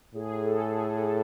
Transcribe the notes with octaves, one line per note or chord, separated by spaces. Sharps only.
A2 G#4
A4
G#4
A4